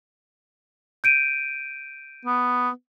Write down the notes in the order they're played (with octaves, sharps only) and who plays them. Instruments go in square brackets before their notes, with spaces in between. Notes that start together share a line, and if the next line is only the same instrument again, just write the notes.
[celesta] G6 D7 D#7
[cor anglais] B3